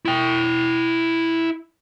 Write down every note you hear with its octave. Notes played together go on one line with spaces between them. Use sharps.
E4 G5